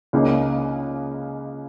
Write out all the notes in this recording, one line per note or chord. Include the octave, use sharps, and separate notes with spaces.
C#2 C#3 A#3 D#4